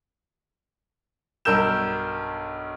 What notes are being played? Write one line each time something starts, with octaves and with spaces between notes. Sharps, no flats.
B1 G2 A#4 E6 G6 E7